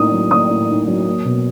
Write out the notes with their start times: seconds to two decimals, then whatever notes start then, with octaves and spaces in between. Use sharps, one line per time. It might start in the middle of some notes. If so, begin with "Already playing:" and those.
Already playing: A2 A#3 D#4 D#6
0.12 F#3
0.30 A#3 D#6
0.50 A2
0.69 D#4
0.88 F#3
1.07 A#3
1.25 B2